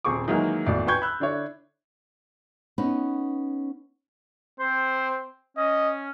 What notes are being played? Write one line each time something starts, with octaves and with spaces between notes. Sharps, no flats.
D#1 C4 G#4 C#6 D6
D#3 E3 F#3 G#3 A#3
G#1 E2 A2 D5
B4 G5 G#5 C#6 G6 G#6
B5 E6 F#6
D3 D4 E4 C#5
B3 C#4 D#4 B4
C4 C5
C#4 D#5